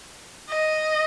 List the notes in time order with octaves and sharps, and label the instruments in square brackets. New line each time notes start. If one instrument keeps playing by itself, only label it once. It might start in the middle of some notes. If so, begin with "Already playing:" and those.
[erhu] D#5